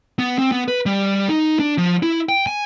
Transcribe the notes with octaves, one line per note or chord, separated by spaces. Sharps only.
B3
C4
B3
B4
G3
D#4
D4
F3
E4
G5
G#5